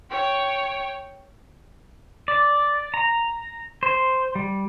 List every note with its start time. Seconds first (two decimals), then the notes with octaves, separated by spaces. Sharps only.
0.11 C#5 G5
2.28 D5
2.94 A#5
3.83 C5
4.35 G3